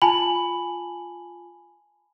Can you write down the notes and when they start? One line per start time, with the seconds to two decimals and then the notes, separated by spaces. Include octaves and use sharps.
0.02 F4 G#5 A5 B5 F#7